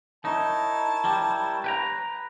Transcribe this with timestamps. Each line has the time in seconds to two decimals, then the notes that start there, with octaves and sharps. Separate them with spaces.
0.25 D#4 E4 A#4 C#5 A5
1.05 G3
1.64 B4 G5 A#5